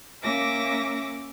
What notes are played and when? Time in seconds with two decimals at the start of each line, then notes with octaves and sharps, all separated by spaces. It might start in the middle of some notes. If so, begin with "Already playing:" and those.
0.23 A#3 C#4 E5 D6 A#6